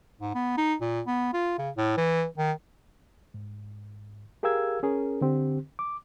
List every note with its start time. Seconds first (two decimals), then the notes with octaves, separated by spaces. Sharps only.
0.21 G#2
0.35 B3
0.57 D#4
0.81 A#2
1.06 B3
1.33 F4
1.59 C#3
1.77 A2
1.97 E3
2.38 D#3
3.34 G#2
4.43 G4 G#4 A#4 F5 E6 G#6
4.83 C#4 G#4 A#4
5.21 D3 C4 G4
5.79 D6